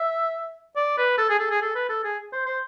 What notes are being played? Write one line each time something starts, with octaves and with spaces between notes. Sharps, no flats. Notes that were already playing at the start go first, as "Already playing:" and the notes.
Already playing: E5
D5
B4
A4
G#4
A4
G#4
A4
B4
A4
G#4
C5
C5